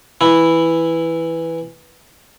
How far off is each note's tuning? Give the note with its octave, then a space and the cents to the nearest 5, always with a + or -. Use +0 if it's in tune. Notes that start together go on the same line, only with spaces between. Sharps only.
E3 +0 E4 +0